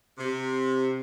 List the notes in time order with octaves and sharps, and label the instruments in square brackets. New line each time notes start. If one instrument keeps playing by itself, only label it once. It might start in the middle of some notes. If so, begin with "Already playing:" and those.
[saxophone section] C3